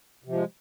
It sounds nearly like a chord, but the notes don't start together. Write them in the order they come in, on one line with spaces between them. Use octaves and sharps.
C3 F3 G#3